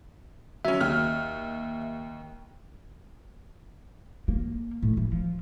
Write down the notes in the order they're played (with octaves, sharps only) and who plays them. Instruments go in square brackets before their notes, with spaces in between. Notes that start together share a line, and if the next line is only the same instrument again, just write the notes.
[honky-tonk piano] F#3 C#4 [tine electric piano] E5
[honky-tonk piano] D#2 F6
[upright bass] A#3
A2
E3
F3